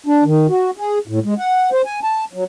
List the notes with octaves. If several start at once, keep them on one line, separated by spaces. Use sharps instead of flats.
D4
D#3
F#4
G#4
A2
G#3
F#5
C5
G#5
A5
F#3